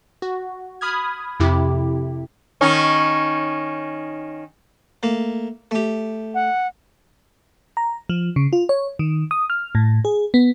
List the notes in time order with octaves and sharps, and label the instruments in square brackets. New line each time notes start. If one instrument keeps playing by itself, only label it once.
[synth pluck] F#4
B5 D#6 F6 G#6
F2 C3 E4 G4
[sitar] D#3 C#4 D#4
[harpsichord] A3 A#3
A3 G4
[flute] F#5
[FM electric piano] A#5
F3
C#3
F4
C#5
D#3
D#6
F6
A2
G#4
B3